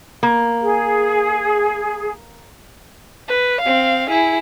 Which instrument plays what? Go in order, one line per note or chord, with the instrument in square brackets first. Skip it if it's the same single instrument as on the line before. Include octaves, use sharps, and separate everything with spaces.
[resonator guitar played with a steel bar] A#3
[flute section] G#4
[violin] B4
C4 F5
E4 G#4